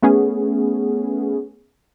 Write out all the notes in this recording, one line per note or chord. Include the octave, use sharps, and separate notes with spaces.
A3 B3 C#4 G#4